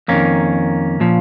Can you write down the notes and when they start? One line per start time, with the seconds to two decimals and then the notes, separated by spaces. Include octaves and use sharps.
0.08 F2 D#3 A#3 C#4
1.00 A#2 F3